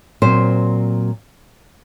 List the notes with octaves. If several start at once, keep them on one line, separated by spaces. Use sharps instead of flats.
A#2 F#3 C4 C5